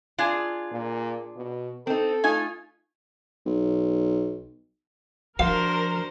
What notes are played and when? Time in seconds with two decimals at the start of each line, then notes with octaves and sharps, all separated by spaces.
0.19 D4 F4 G#4
0.72 A#2
1.37 B2
1.87 C4 D#4 A4
2.24 A3 D#4 F4 G#5
3.46 B1
5.39 F3 D4 F#4 A#4 C5 F5